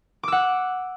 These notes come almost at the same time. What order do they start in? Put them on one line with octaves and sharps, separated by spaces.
D6 E6 F#5